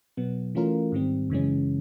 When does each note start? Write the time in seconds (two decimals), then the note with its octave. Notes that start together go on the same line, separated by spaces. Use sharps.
0.17 B2 F#3 B3
0.55 E3 A3 C#4 F4 A#4
0.92 G#2 D#3 G3 C4
1.30 F#2 C#3 E3 G#3 C#4